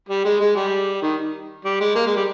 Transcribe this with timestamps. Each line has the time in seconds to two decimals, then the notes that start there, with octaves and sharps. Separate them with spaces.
0.09 G3
0.25 G#3
0.41 G#3
0.56 G3
1.02 D#3
1.65 G3
1.81 G#3
1.95 A#3
2.06 G#3
2.16 G3